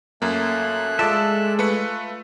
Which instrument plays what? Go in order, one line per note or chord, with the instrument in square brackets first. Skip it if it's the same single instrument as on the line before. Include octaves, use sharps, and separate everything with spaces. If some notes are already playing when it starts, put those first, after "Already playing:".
[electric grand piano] F#2 A#3 [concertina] A3 F#6
[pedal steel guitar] G#3 D5 E5 [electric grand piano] F4 A4 A5
[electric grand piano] A3 B4 C#7 [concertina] F4